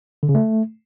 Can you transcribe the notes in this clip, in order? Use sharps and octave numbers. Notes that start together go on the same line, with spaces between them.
D3
C#3
A3